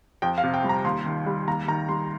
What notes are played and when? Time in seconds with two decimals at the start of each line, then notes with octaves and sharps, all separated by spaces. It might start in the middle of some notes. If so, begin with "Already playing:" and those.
0.22 F2 G5
0.38 F5
0.43 C3
0.54 G5
0.64 G3
0.69 A#5
0.84 D#2 C6
1.06 D#3
1.26 G3
1.48 D#2 A#5
1.68 D#3 A#5
1.89 G3 C6